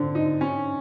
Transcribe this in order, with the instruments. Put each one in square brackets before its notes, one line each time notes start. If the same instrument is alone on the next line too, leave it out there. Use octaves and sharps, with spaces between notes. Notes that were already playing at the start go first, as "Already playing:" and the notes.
Already playing: [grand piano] D3 C4 [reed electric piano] D4
[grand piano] D#4
C#4